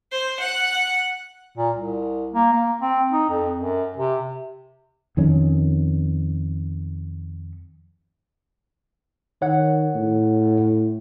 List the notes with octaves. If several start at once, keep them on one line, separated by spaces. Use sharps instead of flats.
C5
F#5
A#2
C2
A#3
A#3
C4
D#4
F2
F#2
C3
F2 D#3 C#4
D#3 C#5 F#5
A2